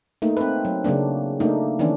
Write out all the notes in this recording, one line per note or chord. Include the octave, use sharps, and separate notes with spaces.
A3 A#3 D#4
C4 B4
F#3
C#3 F#3 A#3 D4
A3 A#3 D4 D#4
D#3 E3 A#3 C#4 D4